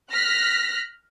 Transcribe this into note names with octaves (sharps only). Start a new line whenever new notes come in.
F6 F#6 A#6 B6